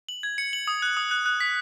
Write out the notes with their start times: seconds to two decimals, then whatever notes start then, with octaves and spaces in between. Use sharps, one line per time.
0.09 F#7
0.23 G#6
0.38 C#7
0.53 F#7
0.68 D#6
0.82 F#6
0.97 D#6
1.11 F#6
1.26 F#6
1.41 B6